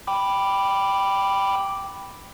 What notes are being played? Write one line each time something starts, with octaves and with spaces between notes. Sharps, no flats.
G5 B5 D6